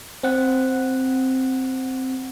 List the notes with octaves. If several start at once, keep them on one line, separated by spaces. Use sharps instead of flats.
C4 F#5